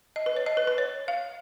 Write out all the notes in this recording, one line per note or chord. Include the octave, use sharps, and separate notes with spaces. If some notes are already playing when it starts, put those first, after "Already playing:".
D#5
B4
C#5
D#5
B4
B4
C#5
F5